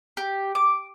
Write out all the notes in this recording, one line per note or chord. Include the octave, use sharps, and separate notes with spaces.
G4
D6